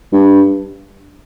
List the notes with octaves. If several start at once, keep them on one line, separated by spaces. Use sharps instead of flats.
G2